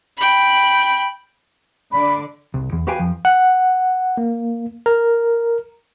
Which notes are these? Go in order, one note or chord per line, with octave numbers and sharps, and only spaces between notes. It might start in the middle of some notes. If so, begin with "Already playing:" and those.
G5 B5
D3 D5 B5
C2
E2
F#4 G4 B4 F5 G5 G#5
F2 F3
F#5
A#3
A#4